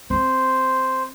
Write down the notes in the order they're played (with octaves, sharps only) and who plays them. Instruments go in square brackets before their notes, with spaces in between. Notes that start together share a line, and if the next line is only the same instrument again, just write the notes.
[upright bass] C4 [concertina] C5